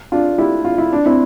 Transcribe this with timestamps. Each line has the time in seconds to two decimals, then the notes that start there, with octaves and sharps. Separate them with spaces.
0.12 D4 F4
0.38 E4 G4
0.65 F4
0.78 E4
0.93 D4
1.06 C4 E4